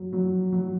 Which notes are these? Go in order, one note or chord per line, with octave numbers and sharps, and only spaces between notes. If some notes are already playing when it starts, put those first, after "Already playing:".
Already playing: F#3
F#3
F#3